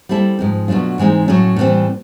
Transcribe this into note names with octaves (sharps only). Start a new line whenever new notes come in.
G3 C4 E4 A4
G#2 F3 G#3 C4
B2 F#3 A3 D4 F4
G#2 E3 G#3 C4 D#4
A2 F#3 A3 C#4
A2 E3 G3 C4